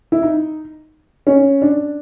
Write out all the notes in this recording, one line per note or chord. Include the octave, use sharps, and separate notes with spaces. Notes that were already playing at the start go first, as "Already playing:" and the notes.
E4
D#4
C#4
D4